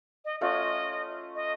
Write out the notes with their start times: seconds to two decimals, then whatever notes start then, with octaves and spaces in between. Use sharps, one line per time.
0.25 D#5
0.41 A3 C#4 F4 D#5
1.35 D#5